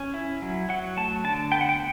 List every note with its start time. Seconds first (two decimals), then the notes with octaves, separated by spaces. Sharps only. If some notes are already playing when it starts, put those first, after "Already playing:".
Already playing: C#4
0.14 E4
0.42 F#3
0.69 F#3 F#5
0.97 A3 A5
1.24 D3 A5
1.52 B3 G5
1.61 F#5
1.69 G5